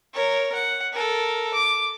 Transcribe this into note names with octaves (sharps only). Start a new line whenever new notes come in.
A#4 C#5
F#5
A4 A#4
D6